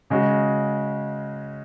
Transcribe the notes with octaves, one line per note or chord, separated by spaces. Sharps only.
C#3 G#3 C#4 F#4